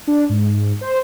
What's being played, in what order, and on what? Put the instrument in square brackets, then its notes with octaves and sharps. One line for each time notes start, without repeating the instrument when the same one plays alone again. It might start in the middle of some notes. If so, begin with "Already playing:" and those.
[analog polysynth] D4
G#2
C5